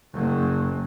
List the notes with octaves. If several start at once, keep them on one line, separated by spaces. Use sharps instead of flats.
F#1 F#2